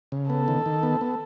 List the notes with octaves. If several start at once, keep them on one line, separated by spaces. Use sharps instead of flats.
C#3
B3 A4
D#3
D#3
B3
B3